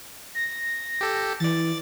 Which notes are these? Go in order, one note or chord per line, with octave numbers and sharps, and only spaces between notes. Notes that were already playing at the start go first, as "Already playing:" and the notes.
A#6
G4 A4
E3 D5 A6